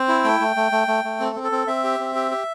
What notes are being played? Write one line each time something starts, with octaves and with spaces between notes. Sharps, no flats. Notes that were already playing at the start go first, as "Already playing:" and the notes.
Already playing: C4 C5
E4
A3 G5
A3
A3
A3
A3
A3
C4 A4
C4
A4
C4
C4 E5
G4
C4
G4
G4